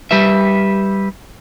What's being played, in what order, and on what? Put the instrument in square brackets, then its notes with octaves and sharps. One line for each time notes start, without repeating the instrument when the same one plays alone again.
[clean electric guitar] G3 G4 B4 E5